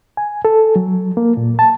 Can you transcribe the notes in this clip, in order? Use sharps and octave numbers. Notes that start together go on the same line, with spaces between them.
G#5
A4
F#3
A#3
A#2
A5